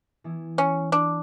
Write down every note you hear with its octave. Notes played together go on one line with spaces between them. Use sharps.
E3 B3 E4
C#4
D4